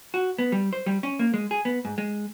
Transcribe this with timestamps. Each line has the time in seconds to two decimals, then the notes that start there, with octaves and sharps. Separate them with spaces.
0.14 F#4
0.39 B3
0.52 G3
0.73 C5
0.86 G3
1.03 C#4
1.19 A#3
1.34 G#3
1.51 G#4
1.65 B3
1.85 G#2
1.98 G#3